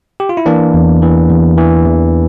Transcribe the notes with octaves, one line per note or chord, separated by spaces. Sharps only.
G4
F4
E4
E3 A#3 D4
E2
E3
E2
E3
E2